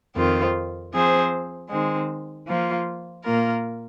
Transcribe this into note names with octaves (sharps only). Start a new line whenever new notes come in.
F2 D#3 C4 F4
F3 C4 G#4 C5
D#3 G#3 C4
F3 A#3 F4
A#2 A#3 F4 A#4